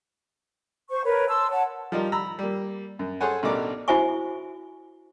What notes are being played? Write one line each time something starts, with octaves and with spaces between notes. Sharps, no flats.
C5 C#6
A#4 B4 C#5
A5 C6 E6
C#5 F#5 A5
F3 G3 D#4 F4 A#4
A#5 B5 E6
G3 A#3
F#2
G#4 A4 C5 C#5 F#5 G#5
A1 B2 D4 D#4 A#4 D6
E4 F#4 C5 E5 G#5 C#6